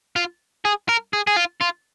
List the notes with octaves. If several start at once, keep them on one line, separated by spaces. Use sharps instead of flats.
F4
G#4
A#4
G#4
G#4
F4
F4